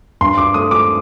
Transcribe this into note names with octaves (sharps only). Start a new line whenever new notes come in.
G2 C6
D6
A3 D#6
D6